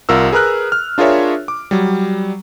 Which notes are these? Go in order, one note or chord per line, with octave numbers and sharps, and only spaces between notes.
C2 F4 A#4 E6
G#4 A#4 B4 A#5 F6 F#6
F6
D4 F4 G#4 A#4 C#5 E5
D6
F#3 G3